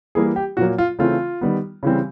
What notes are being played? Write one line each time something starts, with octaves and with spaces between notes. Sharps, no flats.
E3 G3 A#3 G#4
G4
A#2 F#3 A#3 F#4
F4
C#3 E3 A3 C4 F4
D#3 G3 B3
C#3 E3 G3 C4